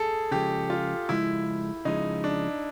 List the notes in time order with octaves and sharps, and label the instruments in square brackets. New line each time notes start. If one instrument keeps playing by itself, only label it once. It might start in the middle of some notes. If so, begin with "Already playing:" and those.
Already playing: [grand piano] G#4 A4
[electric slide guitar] C#3 F3 G#3 [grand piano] G4
[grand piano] F4
[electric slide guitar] C#3 F3 G#3 [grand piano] E4
[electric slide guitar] C#3 F3 G#3 [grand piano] D#4
[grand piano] D4